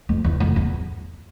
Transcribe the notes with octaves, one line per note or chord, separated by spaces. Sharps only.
F2
E2
F2
E2